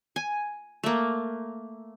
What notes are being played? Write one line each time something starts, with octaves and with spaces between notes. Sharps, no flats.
G#5
A3 A#3